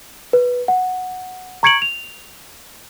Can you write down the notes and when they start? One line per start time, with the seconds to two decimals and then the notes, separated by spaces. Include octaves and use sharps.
0.33 B4
0.68 F#5
1.63 A#5 C#6 G#6 C#7 D7 F#7
1.82 F7